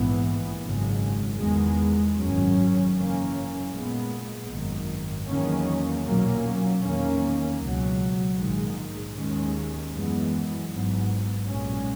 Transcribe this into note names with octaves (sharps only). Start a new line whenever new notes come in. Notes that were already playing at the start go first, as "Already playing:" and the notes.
Already playing: A#1 G#2 E3 B3
G#1 F#2 C#3 G#3
E2 D#3 G#3 B3
G#1 F#2 D#3 F#3 C#4
F#1 F#2 E3 A#3 C#4
A#1 A#2 G#3 B3
G#1 F#2 D#3
E2 D#3 F#3 A#3 C#4
B1 A#2 F#3 A#3 C#4
E2 D#3 A#3 C#4
C#2 B2 F#3
A#1 G#2 D#3 G#3
D#2 D#3 G#3 C#4
F#2 E3 G#3 B3
G#1 G#2 F#3 B3
B1 A#2 G#3 C#4